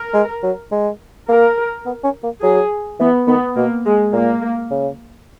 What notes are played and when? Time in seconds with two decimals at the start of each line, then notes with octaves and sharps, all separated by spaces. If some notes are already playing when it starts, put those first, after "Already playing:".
Already playing: A#4
0.14 G#3
0.43 F#3
0.72 G#3
1.29 A#3 A#4
1.86 B3
2.04 C#4
2.23 A#3
2.42 F#3 G#4
3.00 E3 B3
3.27 D#3 B3
3.56 B2 A#3
3.85 G#3
4.13 A#2 A#3
4.71 C#3